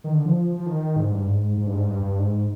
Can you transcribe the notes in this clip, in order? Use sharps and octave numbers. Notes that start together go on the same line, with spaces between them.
D#3
D3
F3
F3
D#3
G#2
G2
G#2
G#2
G2
G#2
G2
G2
G#2